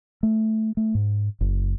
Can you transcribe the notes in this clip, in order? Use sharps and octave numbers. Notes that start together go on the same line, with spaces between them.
A3
A3
G#2
F#1